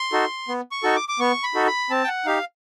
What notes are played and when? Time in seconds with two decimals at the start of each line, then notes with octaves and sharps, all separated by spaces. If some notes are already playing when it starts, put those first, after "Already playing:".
Already playing: C6
0.12 D#4 F#4 A4
0.48 B3
0.72 C#6
0.83 D#4 F#4 A4
0.96 D6
1.09 D6
1.20 B3 C#6
1.43 B5
1.55 D#4 F#4 A4
1.67 B5
1.90 C4 A5
2.03 G5
2.08 F#5
2.25 D#4 G4 F5